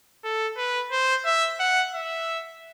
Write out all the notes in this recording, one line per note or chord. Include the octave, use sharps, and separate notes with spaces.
A4
B4
C5
E5
F#5
E5